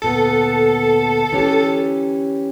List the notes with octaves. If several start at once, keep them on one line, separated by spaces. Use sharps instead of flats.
D2 A#2 B3 A4
E3 C#4 G4